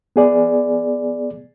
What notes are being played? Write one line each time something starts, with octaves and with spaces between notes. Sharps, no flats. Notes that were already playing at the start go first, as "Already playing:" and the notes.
B3 G#4 D5